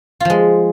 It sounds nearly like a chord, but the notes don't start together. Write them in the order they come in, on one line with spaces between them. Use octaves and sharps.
F4 F3 G#3